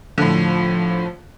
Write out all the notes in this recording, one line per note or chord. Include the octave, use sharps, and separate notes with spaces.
A2 D3 F3